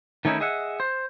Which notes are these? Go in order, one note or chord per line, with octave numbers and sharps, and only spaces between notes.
D#3 A3 C#4 D#4 E4
G#4 D#5 E5 F#5
C5